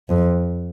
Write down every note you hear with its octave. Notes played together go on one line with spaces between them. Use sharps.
F2